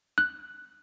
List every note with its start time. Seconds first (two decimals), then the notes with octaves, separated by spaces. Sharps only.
0.18 F#6